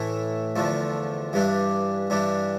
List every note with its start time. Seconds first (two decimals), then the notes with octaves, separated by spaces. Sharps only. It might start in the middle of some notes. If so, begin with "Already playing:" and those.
Already playing: A2 E3 A3 E4
0.56 E2 D3 F3 A3
1.33 G2 E3 G3 D4
2.10 G2 E3 G3 D4